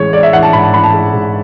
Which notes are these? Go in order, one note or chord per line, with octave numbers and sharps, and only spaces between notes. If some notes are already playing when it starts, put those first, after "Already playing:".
Already playing: A1 G#3 C#5
G#3 D5
E5
A1 F#5
A5
G#2 B5
A5
A1 B5
A5
G#3
G#2